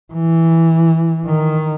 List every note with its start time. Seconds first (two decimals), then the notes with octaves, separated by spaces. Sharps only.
0.13 E3
1.26 D#3